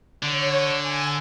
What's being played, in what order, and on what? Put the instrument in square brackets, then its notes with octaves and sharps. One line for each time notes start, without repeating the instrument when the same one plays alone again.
[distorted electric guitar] D3 [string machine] C#5
[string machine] G#5